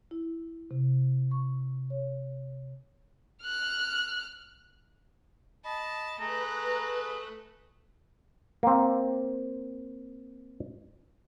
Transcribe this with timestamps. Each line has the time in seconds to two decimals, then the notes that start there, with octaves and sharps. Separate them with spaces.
0.11 E4
0.71 C3
1.31 C#6
1.90 C#5
3.45 F6 F#6
5.65 D#5 A5 B5
6.20 A3 G#4 B4 A#5 F#6
8.63 A#3 C4